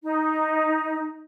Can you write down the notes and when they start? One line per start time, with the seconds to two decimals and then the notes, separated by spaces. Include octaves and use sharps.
0.04 D#4